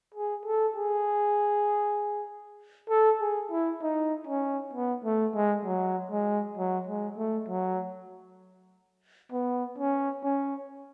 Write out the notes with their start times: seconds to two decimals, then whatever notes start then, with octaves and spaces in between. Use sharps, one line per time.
0.14 G#4
0.45 A4
0.76 G#4
2.89 A4
3.20 G#4
3.51 E4
3.82 D#4
4.27 C#4
4.73 B3
5.05 A3
5.35 G#3
5.65 F#3
6.11 G#3
6.57 F#3
6.87 G#3
7.17 A3
7.49 F#3
9.32 B3
9.78 C#4
10.23 C#4